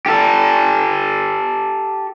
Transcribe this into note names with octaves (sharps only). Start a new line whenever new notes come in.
G4 A4